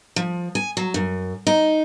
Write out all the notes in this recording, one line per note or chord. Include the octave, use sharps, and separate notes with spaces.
F3
G#5
F#3
F#2
D#4